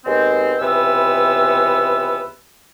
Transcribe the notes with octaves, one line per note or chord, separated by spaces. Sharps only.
D#2 B2 G#3 C4
C#2 C3 E3 B3 E6